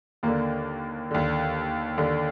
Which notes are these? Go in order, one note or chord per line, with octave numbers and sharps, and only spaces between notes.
D#2 D3 A#3
D#2 D3
D#2 D3